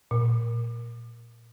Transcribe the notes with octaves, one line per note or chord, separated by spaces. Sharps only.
A#2